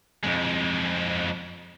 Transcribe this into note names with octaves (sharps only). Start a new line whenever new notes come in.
F2 G#3